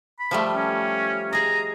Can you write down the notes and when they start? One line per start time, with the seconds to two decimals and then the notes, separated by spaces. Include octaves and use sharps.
0.19 B5
0.31 F3 G3 A3
0.55 C#4
1.33 G#4 D#5 A#5